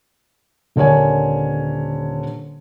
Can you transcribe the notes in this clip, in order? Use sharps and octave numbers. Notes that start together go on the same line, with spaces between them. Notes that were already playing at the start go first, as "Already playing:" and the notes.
D#1 D3 A#4 C#5 G#5